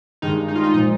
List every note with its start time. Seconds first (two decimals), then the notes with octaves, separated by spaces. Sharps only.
0.22 G2 D#3 G#3 D#4
0.48 D#4
0.55 F4
0.63 D#4
0.74 A#2 F3 G#3 D#4